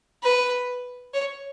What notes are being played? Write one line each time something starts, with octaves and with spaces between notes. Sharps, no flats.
B4
C#5